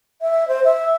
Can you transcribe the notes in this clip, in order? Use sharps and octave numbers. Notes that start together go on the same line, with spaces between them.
E5
C5
E5